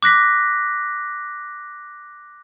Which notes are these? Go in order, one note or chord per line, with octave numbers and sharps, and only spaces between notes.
D6 F#6 A#6 B6